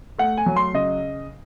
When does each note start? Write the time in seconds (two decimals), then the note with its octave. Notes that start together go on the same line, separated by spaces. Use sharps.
0.18 A3 F#5
0.37 G#5
0.46 F#3
0.56 C6
0.74 C#3 D#5